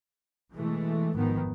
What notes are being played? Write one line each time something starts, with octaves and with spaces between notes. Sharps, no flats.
B2 E3 G#3 A3
G#1 F2 G#2 D#3 F3 B3